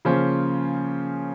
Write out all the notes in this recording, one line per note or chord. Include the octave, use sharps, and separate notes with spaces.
C#3 F3 A#3 C#4 C5